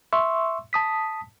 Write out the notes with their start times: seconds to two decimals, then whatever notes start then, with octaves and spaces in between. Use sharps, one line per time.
0.13 E5 C6 C#6 E6
0.73 A5 D#6 B6